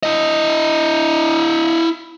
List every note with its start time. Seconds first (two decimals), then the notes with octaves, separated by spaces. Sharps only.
0.03 E4 D#5